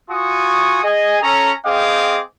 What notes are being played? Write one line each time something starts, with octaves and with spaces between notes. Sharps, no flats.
F4 F#4 G#5 C#6 D#6
G#4 D#5 G#5
C#4 A4 A#5
C4 G#4 D#5 F5 G5 D6